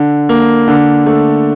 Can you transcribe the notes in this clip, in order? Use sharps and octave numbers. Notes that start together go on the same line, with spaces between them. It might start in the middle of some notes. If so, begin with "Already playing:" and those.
Already playing: D3
A#3
D3
A3